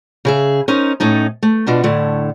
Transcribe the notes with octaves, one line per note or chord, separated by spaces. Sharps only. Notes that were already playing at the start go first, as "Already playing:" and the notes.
C#3 G#4 E5
C#4 D#4 A#4 C5
A2 C#4 D#4 A4
A3
B2 D4 F4 F#4
A2 D3 A3